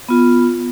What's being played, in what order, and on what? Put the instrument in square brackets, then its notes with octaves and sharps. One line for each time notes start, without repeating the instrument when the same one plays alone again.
[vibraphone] B3 F4